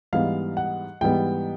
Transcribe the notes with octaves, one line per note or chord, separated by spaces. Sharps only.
G#2 E3 G3 B3 F5
F#5
G#2 E3 G3 B3 G5